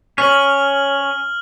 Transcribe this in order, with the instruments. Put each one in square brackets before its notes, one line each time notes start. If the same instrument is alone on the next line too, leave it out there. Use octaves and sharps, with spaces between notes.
[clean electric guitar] C#4 [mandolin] C#5 [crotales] F6 F#7